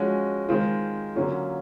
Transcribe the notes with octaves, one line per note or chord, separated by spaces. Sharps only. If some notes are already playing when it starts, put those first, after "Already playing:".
Already playing: F3 G#3 C#4 F#4
D#3 G#3 C4 F4
D3 F#3 A#3 C#4 F4